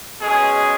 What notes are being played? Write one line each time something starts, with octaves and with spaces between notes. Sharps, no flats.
B2 G#3 C#4 G#4